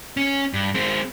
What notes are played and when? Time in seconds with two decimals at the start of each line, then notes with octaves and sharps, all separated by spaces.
0.17 C#4
0.53 G2
0.75 G#3 C4